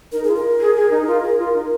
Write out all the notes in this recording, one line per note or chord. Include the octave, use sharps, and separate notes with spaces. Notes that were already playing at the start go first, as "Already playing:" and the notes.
D#4 A#4
F4 G#4
A#4
G#4
G#4
D#4
F4
G#4
F4
D#4